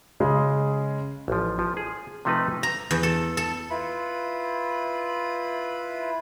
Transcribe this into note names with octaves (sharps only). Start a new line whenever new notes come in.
C#3 G#3
A1 F3
F3
G#4
C3 F3 A3 D#4 B4
A#5
E2
A4
A4
E4 F4 B4 B5